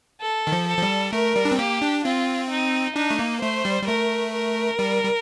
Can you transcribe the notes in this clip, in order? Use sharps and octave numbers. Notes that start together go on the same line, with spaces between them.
A4
D#3
F3
A4
F3
G3
A3 A#4
G3
D4
C4
A#3 G4
D4
C4 F4
D#4
D4 D#4
A3
A#3
A3 C5
G3
G3
A3 A#4
A#4
G3
G3